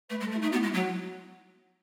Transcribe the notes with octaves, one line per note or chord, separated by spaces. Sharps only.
A3 B4
G#3
A4
A3
E4
A3 D#4
B3 F#4
E4
G#3
F#3 F#4